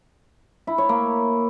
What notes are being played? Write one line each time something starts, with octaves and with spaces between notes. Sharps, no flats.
E4
C#5
A#3